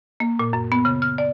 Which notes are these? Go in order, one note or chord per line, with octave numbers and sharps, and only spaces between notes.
A#3
A#2
F#2
B3
C#3
F6
D5